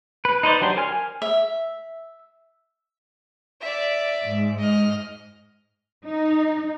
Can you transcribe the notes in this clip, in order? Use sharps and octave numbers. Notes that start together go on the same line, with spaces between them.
B4
D#4 B4 C5 D5
F#3 D4 G4 C5
A#4 G#5 F6
E5
D5 E5
G#2
D#5 F6
D#4